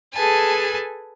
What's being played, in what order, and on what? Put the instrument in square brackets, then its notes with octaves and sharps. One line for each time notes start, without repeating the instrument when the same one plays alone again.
[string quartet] G#4 A4 B4 G#5 A5